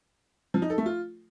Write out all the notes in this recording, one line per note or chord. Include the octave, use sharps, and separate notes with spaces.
F3
D#4
A4
A3
F4